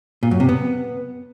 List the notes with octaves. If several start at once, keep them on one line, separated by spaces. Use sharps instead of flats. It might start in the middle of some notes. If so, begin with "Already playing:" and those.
A#2
F#2
C3
B3